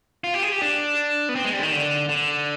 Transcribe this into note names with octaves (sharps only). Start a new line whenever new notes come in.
F4
G4
G#4
G4
D4
B3
C4
G#3
G3
D3
D#3
D3
D3